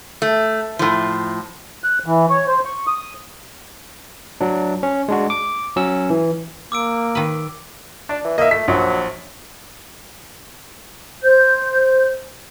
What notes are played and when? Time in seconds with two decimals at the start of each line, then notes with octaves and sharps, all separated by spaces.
0.22 A3
0.79 A2 F3
1.84 F#6
2.06 E3
2.30 C#5
2.47 C5
2.65 C#6
2.87 D#6
4.41 F#3 D4
4.83 C#4
5.08 G#3 D4 F#4
5.30 D6
5.76 F#3 C#4 E6
6.10 E3
6.72 A#3 D6 E6 D7
7.15 D#3 B4
8.09 D4 D5
8.24 E3
8.38 A#3 D#5 E5
8.51 A3 B6
8.68 A#1 F#3
11.24 C5 G6